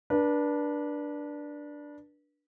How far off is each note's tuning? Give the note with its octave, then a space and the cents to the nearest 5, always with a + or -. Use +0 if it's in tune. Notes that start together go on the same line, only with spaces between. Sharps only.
D4 +0 B4 -35